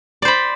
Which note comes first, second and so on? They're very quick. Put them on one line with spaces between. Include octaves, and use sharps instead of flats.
D5 C5 B5